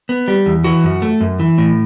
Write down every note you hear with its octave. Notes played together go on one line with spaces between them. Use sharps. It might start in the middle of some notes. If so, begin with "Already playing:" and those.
B3
G3
E2
E3 F#4
F#2
A3
F#2
E3
A2